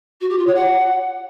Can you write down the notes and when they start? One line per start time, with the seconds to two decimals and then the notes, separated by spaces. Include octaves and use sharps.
0.21 F#4
0.29 G4
0.38 F4
0.46 C#5
0.55 F#5